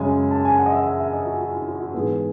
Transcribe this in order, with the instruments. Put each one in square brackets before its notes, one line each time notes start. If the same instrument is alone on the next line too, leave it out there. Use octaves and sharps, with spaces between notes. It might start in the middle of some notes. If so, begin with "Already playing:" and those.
Already playing: [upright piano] F#2 C#3 G#3 G#5
A5
G#5
F#5
D#5
E5
E5
E5
D#5
F#4
F#4
E4
F#4
F#4
G#2 E3 B3 G#4